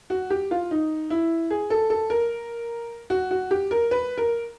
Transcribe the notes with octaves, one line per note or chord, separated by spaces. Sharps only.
F#4
G4
F4
D#4
E4
G#4
A4
A4
A#4
F#4
F#4
G4
A#4
B4
A#4